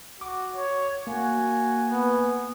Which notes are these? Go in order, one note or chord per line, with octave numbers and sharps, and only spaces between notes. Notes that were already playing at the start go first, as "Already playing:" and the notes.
F#4 D6
C#5
A#3 F#4 G#5
B3